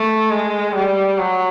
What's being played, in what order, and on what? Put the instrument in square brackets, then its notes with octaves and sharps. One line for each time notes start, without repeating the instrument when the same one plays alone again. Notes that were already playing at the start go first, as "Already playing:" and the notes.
Already playing: [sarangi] A3
G#3
G3
F#3